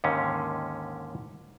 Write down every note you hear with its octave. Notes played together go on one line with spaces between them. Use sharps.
D#2 G#2 D3 D#3 C#4